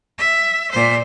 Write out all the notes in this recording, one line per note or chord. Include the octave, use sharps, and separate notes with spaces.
E5
A#2 C5